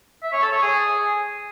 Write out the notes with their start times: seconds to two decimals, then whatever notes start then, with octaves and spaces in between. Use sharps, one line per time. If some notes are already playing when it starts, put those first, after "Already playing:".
0.23 E5
0.32 C#5
0.42 A4
0.52 C#5
0.62 G#4